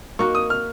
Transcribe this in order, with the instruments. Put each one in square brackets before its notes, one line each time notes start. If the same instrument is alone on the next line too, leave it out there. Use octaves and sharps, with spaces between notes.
[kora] A#3 D#4 F#4 [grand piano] C#6
[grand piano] D#6
F6